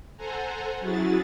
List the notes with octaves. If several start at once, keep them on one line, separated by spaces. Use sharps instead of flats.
A4 C5 F#5 G#5 A#5
F#3 C#4 E4 F#4 G#4 A6